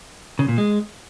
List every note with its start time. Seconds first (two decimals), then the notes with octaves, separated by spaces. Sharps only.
0.39 C#3
0.48 A#2
0.58 G#3